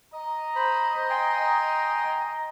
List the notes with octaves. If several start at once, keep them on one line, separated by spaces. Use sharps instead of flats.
D#5 A#5
C5 B5
G5 G#5 C6